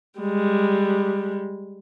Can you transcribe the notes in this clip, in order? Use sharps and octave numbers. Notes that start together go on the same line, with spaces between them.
G3 G#3